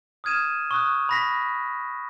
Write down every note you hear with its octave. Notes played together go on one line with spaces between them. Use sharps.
D#6 F6 G#6 D#7 E7
C#6 D#6 F#6
B5 A#6 B6